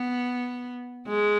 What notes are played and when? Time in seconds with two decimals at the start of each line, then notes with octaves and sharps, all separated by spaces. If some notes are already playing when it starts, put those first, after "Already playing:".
Already playing: B3
1.08 G#3